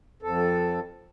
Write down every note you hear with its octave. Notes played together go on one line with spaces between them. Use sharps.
F2 A4